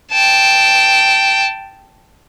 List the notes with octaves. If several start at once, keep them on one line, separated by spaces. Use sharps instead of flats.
G5 A5